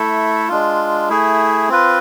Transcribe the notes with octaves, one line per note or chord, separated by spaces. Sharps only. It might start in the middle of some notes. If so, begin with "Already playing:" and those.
Already playing: A3 E4 A4
G#3 D4 F4
A3 E4 G#4
C4 F4 B4